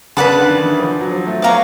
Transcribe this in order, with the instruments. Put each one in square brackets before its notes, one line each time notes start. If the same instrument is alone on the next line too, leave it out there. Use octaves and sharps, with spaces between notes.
[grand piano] C#3 [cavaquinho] B4 D5 F#5 A5
[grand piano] D3
D#3
E3
F3
F#3
F3
A3
[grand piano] B3 [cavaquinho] C#5 F5 A#5 D6